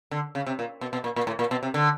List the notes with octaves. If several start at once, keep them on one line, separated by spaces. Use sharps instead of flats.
D3
C#3
C3
A#2
B2
B2
A#2
A#2
A2
A#2
B2
C3
D3